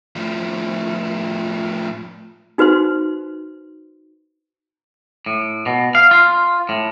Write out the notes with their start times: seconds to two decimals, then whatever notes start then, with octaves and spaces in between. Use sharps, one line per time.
0.16 A2 F3
2.58 D#4 F#4 B4 C5 C6
5.26 A2
5.66 B2
5.95 F5
6.11 F4
6.69 A2